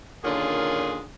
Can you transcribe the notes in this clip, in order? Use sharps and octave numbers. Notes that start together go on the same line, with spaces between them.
A#2 D3 D#3 C#4 F4 G#4